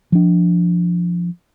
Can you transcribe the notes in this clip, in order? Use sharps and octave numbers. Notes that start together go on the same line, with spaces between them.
F3 D4